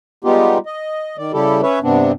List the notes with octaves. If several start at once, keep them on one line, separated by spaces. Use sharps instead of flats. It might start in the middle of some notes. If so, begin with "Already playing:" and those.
G3 G#3 B3 D#4 F4 G4
D#5
D#3 D5
C#3 G3 E4 G4 A4
C#4 B4 C#5 E5
G2 C3 B3 C4 D4